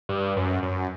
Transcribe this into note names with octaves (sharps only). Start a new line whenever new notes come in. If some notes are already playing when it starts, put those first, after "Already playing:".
G2
F#2
F#2